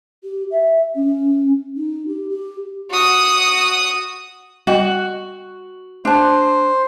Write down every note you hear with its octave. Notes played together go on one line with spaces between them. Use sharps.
G4
E5
C#4
D#4
G4
G4
F#4 D#6
G3 F#4 D#5 G5
D4 C5 A5